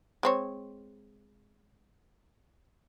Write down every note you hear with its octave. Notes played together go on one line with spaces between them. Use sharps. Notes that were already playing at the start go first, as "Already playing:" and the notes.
G#3 C4 C#5